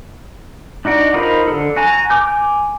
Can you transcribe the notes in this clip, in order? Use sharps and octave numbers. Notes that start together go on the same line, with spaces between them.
D4 D#4 F#4 D5
D#4 F4 A#4 C5 B5
D3 A4
F#4 G#5 A#5
G#5 D6 G6